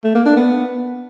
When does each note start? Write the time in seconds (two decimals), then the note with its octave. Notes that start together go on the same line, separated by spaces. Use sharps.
0.04 A3
0.15 A#3
0.26 D4
0.36 B3